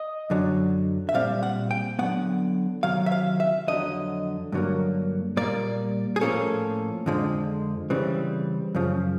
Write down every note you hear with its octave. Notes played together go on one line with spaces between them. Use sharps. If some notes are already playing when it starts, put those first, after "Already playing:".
Already playing: D#5
F#2 D3 F#3
E5
A#2 G3 C4 F5
F#5
G5
D3 F#3 B3 F#5
C3 D#3 F#3 F5
E5
F5
E5
F2 D3 F#3 D#5
G2 D3 F#3 A#3
A#2 G3 A#3 D5
G#4
A2 F3 A#3 C#4 A4
F2 D3 F3 G#3
C#3 E3 G3 C4
F#2 C#3 F3